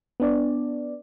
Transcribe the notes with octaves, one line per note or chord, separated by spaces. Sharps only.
B3 D4 D5